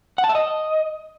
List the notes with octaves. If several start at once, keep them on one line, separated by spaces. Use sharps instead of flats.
F#5
A5
E5
D#5